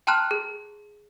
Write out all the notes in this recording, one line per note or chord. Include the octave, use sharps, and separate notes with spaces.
G5 A5 A#5 C6 F6 F#6
G#4